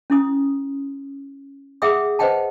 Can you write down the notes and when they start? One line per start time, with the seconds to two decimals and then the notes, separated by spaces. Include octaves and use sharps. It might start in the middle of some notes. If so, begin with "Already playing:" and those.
0.10 C#4 E4 D#6
1.82 G#4 E5 F#5 G5 D#6 E6
2.19 B4 C5 D#5 F#5 G5 A5